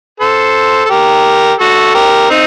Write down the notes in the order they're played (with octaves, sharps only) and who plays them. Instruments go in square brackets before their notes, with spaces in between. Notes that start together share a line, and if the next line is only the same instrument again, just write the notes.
[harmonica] A4 C5
A4
G4 A#4
F#4 A4
G4 A#4
C4 D#4